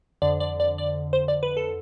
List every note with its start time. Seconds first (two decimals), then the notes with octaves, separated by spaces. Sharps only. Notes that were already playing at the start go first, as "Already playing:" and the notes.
0.22 F2 D3 D5
0.40 D5
0.60 D5
0.78 D5
1.13 C5
1.28 D5
1.43 B4
1.57 A4